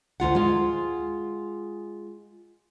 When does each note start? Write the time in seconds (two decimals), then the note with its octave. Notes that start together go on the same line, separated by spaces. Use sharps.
0.20 D2 F4 F#5
0.35 G#3 F4